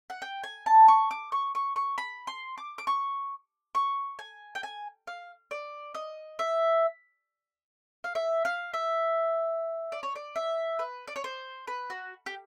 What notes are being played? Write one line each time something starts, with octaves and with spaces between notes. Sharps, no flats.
F#5
G5
G#5
A5
C#6
D6
C#6
C#6
C#6
B5
C6
D6
D6
C#6
C#6
G#5
G5
G#5
F5
D5
D#5
E5
F5
E5
F5
E5
D5
C#5
D5
E5
B4
D5
C#5
C5
B4
F#4
G4